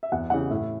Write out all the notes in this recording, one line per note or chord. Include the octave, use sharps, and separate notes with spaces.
E5
E2 F#5
C#3 E3 F#5
A2 E5